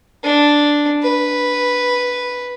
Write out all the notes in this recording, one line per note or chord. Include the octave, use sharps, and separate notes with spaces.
D4
B4